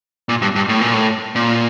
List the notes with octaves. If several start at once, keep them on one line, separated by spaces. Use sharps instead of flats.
A#2
G2
G2
A2
A#2
A2
A#2